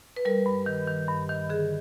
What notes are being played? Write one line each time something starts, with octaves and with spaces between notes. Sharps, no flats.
B4
G3 A#4
G2
D#3
D#3
G2
D#3
D3 G#4